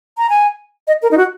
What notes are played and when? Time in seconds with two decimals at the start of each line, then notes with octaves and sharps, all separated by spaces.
0.18 A#5
0.30 G#5
0.87 D#5
1.02 A#4
1.11 D#4
1.17 F#4